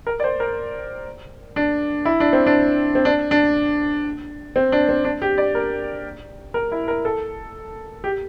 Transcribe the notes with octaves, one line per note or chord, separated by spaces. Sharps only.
A#4
D5
C5
A#4
D4
E4
D4
C4
D4
C4
D4
D4
C4
D4
C4
D4
G4
D5
A#4
A#4
E4
A#4
A4
G4